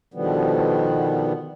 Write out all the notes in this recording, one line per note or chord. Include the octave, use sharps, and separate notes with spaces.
B2 D3 D#3 F3 G3 B3